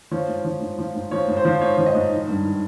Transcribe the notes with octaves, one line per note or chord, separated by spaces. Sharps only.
F3 C#5
G#2
F3
G#2
F3
G#2
F3 C#5
G#2
C5
F3
G#2 C#5
F3
D#5
G#2
D#3
G2
D#3